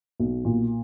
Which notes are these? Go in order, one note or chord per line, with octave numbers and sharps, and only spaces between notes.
B1
A#2